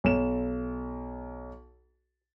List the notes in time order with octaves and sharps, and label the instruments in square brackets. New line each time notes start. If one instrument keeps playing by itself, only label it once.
[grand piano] B1 E7